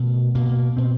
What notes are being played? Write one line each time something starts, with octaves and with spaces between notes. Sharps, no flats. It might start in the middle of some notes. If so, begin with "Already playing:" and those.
Already playing: B2 A3
B2 A#3
B2 C4